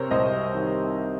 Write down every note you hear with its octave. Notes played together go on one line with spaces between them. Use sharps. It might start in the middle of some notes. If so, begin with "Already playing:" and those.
Already playing: C3 A#4 C5 C#5
C2 C5 D#5
D#3